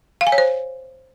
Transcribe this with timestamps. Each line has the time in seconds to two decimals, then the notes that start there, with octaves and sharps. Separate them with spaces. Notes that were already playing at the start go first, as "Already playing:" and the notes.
0.21 F5
0.27 G#5
0.32 C#5
0.38 C5